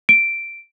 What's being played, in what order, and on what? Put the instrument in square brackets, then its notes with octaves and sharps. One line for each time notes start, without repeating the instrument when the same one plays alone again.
[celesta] D7